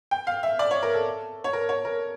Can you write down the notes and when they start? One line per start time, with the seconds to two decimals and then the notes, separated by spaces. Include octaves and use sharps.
0.11 G5
0.27 F5
0.43 E5
0.59 D5
0.71 C#5
0.83 A#4
0.94 A4
1.44 C#5
1.53 A#4
1.69 C#5
1.85 A#4